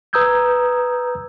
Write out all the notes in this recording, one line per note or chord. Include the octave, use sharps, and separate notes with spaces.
B4 A#5 D#6 E6 G6 G#6